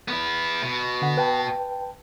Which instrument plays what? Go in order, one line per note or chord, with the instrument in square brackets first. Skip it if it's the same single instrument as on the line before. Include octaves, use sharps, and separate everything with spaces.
[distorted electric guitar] B3 E4
B2
[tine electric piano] D3 F#5
B4 G5 A5